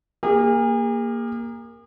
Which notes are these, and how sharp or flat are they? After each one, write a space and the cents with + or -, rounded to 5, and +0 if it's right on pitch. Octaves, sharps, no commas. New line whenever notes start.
A#3 +0 G#4 -40